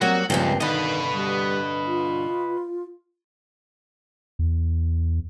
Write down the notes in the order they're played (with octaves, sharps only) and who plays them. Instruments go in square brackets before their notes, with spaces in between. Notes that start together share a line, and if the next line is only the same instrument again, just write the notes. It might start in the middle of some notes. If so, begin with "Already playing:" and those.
[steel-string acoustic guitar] F#3 G3 A#3 [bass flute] C4 [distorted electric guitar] F#4
[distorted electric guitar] C#2 [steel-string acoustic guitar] G2 A#2 C4 [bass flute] F3
[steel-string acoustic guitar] G2 D3 [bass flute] D#3 [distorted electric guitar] B4 D#5
[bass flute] G3
F4
[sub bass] E2